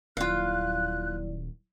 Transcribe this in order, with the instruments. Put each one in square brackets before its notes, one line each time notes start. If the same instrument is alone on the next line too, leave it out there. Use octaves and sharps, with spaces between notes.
[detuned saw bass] D#1 [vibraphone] F#3 E4 D5 [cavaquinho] F4 F5 [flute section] F#6